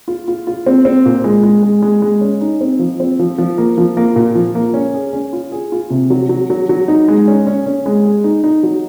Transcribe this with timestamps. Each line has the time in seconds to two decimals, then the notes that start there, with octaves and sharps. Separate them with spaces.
0.08 F4
0.28 F4
0.47 F4
0.66 C4
0.85 C4
1.06 A#2
1.24 G#3
1.43 G#3
1.63 G#3
1.82 G#3
2.02 G#3
2.21 C#4
2.41 D#4
2.61 C4
2.79 F3
3.00 C4
3.19 F3
3.38 F3
3.58 A#3
3.78 F3
3.97 A#3
4.16 A#2
4.35 F3
4.55 A#3
4.74 C#4
4.94 G#4
5.13 C#4
5.33 F4
5.52 G#4
5.72 F4
5.90 C3
6.10 F#3
6.29 F#3
6.50 F#3
6.69 F#3
6.88 D#4
7.08 G#3
7.28 C#4
7.47 C#4
7.66 C#4
7.86 G#3
8.05 G#4
8.24 D#4
8.44 D#4
8.63 F#3